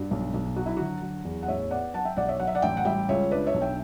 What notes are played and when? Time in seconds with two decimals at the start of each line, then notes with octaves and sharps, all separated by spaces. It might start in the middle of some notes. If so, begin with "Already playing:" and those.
Already playing: G2 F#4
0.11 B1
0.34 B1
0.56 F#3 F#4
0.66 E4
0.77 D3 F#4
1.02 F#3
1.25 E2
1.43 F#5
1.48 A1 C#5 E5
1.71 B3 D5 F#5
1.94 F#3 F#5 A5
2.05 E5 G5
2.17 B1 D5 F#5
2.29 C#5 E5
2.40 F#3 F#5
2.47 E5
2.55 D5 F#5
2.62 A1 E5 G5
2.77 F#5
2.85 G3 E5 G5
3.09 C#2 C#5 E5
3.31 D4 B4 D5
3.47 C#5 E5
3.54 B1
3.61 E5 G5